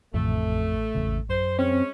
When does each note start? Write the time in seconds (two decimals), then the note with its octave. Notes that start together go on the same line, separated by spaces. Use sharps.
0.14 A1 F2 C3 A3
0.95 G#1 E2 C#3
1.29 F#2 C5
1.59 G#3 C4 C#4